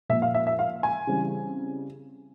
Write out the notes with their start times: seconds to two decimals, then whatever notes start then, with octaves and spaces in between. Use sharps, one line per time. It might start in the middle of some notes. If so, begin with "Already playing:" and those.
0.09 A#2 F3 A#3 E5
0.22 F5
0.34 E5
0.47 E5
0.59 F5
0.83 G#5
1.07 C#3 E3 G3 C4